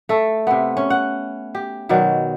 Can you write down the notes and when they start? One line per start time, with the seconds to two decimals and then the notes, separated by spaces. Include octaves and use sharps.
0.09 A3 A4
0.47 C3 B3
0.77 C#4
0.90 F#5
1.55 G4
1.89 B2 D#3 F#3 D5